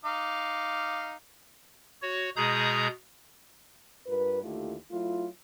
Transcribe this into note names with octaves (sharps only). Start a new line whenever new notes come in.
D#4 F5 D6
F#4 C#5
B2 G#3 G#4 A#5 D#6 G6
G2 F4 A#4 B4
D#2 D3 A3 E4 F4 G4
F#3 A3 E4 F4